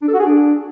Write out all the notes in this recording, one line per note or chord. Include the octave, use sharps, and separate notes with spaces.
D4
A4
F#4
G#4
D4